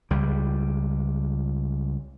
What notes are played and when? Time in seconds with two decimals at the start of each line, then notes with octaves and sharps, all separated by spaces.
0.11 C#2 G3